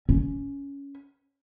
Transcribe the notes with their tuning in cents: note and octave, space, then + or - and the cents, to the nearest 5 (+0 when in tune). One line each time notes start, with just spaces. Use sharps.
C#4 +10